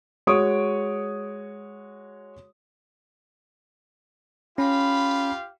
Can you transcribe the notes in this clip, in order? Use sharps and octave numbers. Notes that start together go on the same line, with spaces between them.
G#3 F#4 C#5 C#6 D#6 D7
C#4 F4 G4 F5 B5